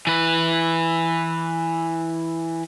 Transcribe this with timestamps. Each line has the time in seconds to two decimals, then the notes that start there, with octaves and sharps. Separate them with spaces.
0.07 E3 B4